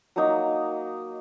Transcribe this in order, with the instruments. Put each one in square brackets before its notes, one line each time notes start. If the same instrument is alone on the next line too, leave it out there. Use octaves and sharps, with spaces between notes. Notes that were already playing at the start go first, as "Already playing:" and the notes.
[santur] F#3 A#3 D#4